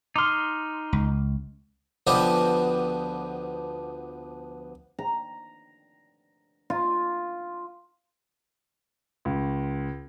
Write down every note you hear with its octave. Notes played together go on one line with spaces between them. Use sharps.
D#4 C6 D6 F6
C#2
D2 F3 B3 G4 D#5
A#5
F4
C#2